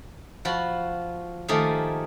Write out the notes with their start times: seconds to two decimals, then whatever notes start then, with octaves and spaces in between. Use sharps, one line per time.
0.45 F3 F4 F#4 B5
1.48 D#3 F3 A3 A#3 G4 G#4